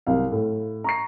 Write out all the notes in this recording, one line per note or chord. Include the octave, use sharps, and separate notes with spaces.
C2 F#3 F5
A2
A#5 C#6 C7